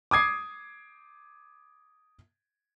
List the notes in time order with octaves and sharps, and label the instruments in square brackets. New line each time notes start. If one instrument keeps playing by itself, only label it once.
[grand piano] D6 D#6 G#6 C7